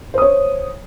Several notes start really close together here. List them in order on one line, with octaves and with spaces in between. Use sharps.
C5 D#6 C#5